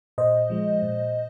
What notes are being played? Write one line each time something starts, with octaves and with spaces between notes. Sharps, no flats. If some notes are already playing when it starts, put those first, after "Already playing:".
A#2 C5 D#5
F3 G#3
A#2